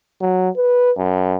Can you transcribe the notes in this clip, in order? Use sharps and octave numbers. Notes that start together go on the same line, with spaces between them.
F#3
B4
F#2